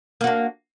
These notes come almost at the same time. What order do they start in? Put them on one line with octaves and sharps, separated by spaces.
A#3 F#4 D4